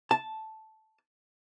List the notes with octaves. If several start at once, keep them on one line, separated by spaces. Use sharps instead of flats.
A5